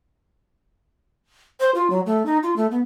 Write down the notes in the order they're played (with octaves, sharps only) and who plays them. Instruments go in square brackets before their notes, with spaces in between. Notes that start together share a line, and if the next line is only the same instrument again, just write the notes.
[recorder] C5
F4
F#3
A3
D#4
F4
A3
B3